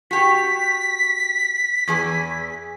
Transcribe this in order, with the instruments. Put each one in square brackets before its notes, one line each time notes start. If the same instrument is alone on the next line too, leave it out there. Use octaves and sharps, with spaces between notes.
[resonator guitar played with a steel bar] F#4 G4 [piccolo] B6
[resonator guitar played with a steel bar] E2 E3 G#4